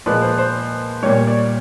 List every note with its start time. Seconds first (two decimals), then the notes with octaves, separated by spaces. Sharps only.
0.06 A#2 F3 G#3 B4
0.22 C5
0.38 C5
1.02 A#2 G3 C#5
1.27 D5